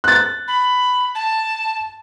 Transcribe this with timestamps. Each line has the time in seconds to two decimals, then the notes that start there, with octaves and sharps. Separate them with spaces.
0.04 F#6 A6
0.48 B5
1.15 A5